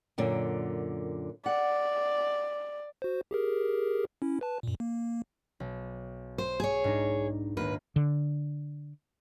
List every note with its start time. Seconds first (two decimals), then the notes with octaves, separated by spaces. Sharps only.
0.18 F#2 A#2 D3
1.46 D5 F#5
3.02 F#4 C5
3.31 G4 G#4 A#4
4.22 C#4 E4
4.41 B4 A5
4.63 F#2 A#2
4.80 A#3
5.60 B1
6.38 C5
6.60 G#4 C#5
6.84 G#2 D4 D#4
7.57 D#1 G#2 A#3 B4
7.96 D3